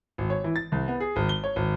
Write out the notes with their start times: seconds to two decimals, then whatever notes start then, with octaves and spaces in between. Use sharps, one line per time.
0.18 G#1
0.30 C#5
0.44 E3
0.56 A6
0.72 C2
0.88 B3
1.00 G#4
1.16 G#1
1.29 G7
1.44 C#5
1.56 G#1